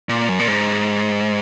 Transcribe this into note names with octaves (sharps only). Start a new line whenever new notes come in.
A#2
F#2
A#2
G#2